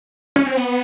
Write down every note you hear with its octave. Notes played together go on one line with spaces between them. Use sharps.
C#4
C4
B3